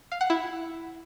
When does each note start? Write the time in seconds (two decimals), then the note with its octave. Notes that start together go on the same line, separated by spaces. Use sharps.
0.12 F5
0.21 F#5
0.30 E4